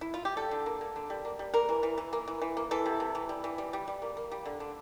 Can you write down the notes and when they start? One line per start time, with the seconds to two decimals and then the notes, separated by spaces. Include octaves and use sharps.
0.01 E4
0.14 F4
0.25 G4
0.37 G3 A4
0.51 D3
0.66 A#3
0.81 A#3
0.96 D3
1.10 G3
1.25 A#3
1.39 G3
1.54 A#3 A#4
1.69 E3
1.83 E3
1.98 E3
2.13 A#3
2.28 E3
2.42 E3
2.57 A#3
2.71 E3 A4
2.86 C3
3.00 C3
3.15 E3
3.29 G3
3.44 E3
3.58 G3
3.73 G3
3.88 G3
4.02 A#3
4.17 A#3
4.32 G3
4.46 D3
4.60 D3